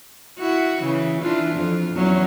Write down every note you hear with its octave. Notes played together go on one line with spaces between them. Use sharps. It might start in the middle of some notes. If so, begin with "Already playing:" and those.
E4 F#4
C#3 E3
E3 D4 F4
F2 F4
E2 F#3 C#4